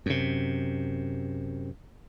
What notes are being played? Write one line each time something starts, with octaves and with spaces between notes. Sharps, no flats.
F#2 C3